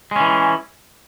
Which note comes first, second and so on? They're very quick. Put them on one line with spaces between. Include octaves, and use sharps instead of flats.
G#3 C#4 E3